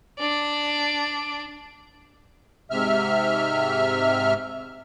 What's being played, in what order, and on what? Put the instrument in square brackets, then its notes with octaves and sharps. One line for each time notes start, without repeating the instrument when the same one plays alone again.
[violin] D4 D5
[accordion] G#2 C3 E5 F6